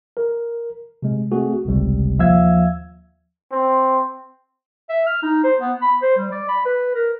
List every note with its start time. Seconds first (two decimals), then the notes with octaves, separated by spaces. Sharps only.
0.17 A#4
1.02 C3 G#3
1.31 A3 C4 F#4 G#4
1.65 G#1 C#2 C3 G3
2.19 D#2 F3 E5 F5 E6 G#6
3.52 C4
4.89 E5
5.07 F6
5.23 D#4
5.44 C5
5.60 B3
5.81 B5
6.02 C5
6.18 G3
6.32 D5
6.48 B5
6.65 B4
6.95 A#4